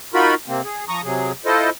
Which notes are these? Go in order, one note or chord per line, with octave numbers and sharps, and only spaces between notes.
D#4 F4 F#4 A#4 B5
C3 A#3 C4
G#4
F3 A#5 C#6 D#6
C3 F#3 G#4
E4 F4 A4 C5 D#5